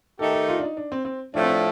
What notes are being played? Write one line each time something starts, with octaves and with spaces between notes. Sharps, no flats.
D#3 A3 D#4 G4 A4
A4
F4
D4
D#4
D4
C4
C4
A2 F3 A3 D4
C4
D4